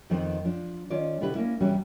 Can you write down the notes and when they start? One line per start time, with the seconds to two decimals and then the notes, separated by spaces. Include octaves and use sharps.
0.10 F2 D#3 F3 B3 C4 D#4
0.45 F3 D4
0.90 D#3 C#4 F4 C#5 D5
1.21 B2 D3 E4 G4 B4
1.35 A#3 C#4 E4
1.60 E2 C3 G3 C#4 F#4 G#5